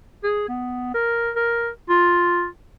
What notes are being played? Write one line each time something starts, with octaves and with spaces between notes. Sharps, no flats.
G#4
B3
A#4
A#4
F4